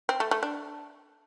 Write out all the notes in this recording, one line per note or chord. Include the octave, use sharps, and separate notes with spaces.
C4
A3
A3
D4